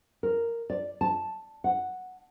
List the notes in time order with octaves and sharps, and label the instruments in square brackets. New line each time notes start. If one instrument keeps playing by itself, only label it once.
[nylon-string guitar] A#4
D5
A5
F#5